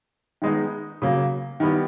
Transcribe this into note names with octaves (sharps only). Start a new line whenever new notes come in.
D#3 G#3 B3 D#4
C#3 F#3 A#3
D#3 G3 B3 E4